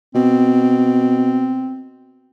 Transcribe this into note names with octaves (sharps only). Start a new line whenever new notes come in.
B2 C4